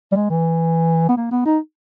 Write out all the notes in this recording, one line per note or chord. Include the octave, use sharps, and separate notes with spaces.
G3
G#3
E3
B3
A#3
B3
D#4